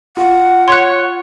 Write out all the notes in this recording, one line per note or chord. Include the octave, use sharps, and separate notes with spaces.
F4 F#5
C#5 C6 F#6